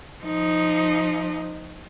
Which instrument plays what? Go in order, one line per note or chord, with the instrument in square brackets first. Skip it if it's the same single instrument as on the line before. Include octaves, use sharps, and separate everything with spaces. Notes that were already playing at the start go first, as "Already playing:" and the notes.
[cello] F3 D#4